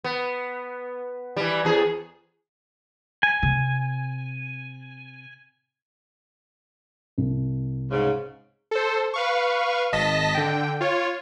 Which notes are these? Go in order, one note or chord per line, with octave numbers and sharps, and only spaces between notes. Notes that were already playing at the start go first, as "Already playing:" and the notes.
B3
E3 G3
E2 G#4
G#5
C3
C2
G#2 C#3
A4 C5
B4 F5 C#6
G#1 D#5 A5 A#6 B6
D3 G5
F4 C#5